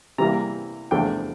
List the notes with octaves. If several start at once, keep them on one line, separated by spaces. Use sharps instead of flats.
C3 E3 G3 A#3 A#5
E2 C3 F3 A3 D4 G5